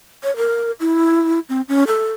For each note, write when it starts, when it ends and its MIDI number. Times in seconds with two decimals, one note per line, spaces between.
0.23 0.35 73
0.37 0.71 70
0.80 1.39 64
1.49 1.61 60
1.68 1.84 61
1.87 2.12 69